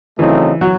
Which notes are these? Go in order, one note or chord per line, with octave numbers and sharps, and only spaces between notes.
C#3 E3 F#3 A3 C4 D#4
F#3